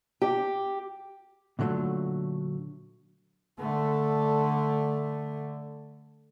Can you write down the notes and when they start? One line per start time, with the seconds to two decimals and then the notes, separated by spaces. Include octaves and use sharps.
0.22 G4
1.59 A#2 D3 F#3 G3 A3
3.60 D3 A3